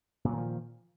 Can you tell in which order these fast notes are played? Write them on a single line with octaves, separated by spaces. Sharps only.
A#2 F#3 D#3 F3